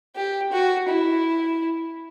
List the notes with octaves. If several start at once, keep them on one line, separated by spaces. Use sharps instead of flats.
G4
F#4
E4